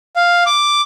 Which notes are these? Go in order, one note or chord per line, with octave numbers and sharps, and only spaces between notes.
F5
D6